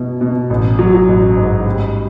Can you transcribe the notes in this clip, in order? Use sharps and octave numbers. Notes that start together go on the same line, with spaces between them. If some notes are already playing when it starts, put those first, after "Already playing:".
Already playing: B2 E4
B2
A1
F#3
A1
G#2
G3